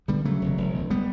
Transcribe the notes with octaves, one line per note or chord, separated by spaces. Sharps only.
D3 G3 B3
C#3 F#3 A3
E1
E1
D2
G3 B3